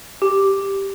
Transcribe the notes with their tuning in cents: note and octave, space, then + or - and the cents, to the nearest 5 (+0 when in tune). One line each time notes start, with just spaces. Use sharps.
G4 +0